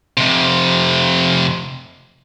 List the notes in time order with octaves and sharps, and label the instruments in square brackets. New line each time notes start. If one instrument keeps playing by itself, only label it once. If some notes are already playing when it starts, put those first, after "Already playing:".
[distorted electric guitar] F2 C3